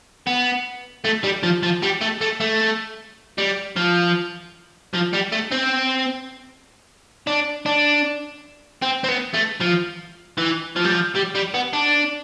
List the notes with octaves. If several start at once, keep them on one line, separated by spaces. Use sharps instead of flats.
B3
A3
G3
F3
F3
G3
A3
A3
A3
G3
F3
F3
G3
A3
C4
D4
D4
C4
C4
B3
A3
F3
E3
F3
G3
F3
G3
G3
B3
D4